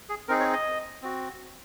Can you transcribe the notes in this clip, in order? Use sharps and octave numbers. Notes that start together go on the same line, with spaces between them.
G#4
C4 D#4 G#4 A#4
C#5
D#5
C4 F#4